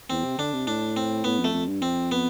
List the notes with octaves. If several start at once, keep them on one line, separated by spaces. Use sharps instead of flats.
E2 C4
C3
D3 D4
C3
A2 D4
C4
A2 B3
F2
A3
F2
G2
F2 C4
B3